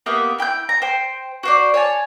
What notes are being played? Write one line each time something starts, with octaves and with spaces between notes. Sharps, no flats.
A#3 B3 G4 E5
E4 G5 E6 G6
A#5
C5 G5
F#4 C5 D5
C#5 G#5 A5